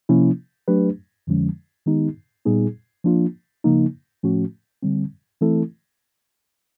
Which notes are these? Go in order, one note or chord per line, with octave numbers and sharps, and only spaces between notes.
C3 F3 A#3 C#4 E4
F#3 A3 D4 G4 B4
F2 D3 F3 G#3 C#4
D#3 G#3 B3 D#4 G4
A#2 G3 B3 D#4 G#4
F3 A#3 D4 F4
C#3 F3 A#3 D#4
A2 F3 A3 C#4 F#4
D3 G3 C4
E3 A3 C4 E4 A4